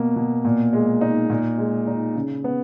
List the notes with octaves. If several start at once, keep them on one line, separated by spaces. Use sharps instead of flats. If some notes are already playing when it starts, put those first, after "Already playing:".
Already playing: B2 A#3
B2
A#2
G#3
D#4
A#2
G#3
D#4
C#3
B3